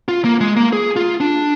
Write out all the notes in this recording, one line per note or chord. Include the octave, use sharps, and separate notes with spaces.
F4
A#3
G#3
A#3
G#4
F4
D4